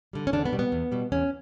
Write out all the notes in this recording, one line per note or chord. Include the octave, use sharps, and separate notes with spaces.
D3 G3
C#4
E2 D3 D4
B3
B2 G3
B3
E2
B2 G3
E2 C#4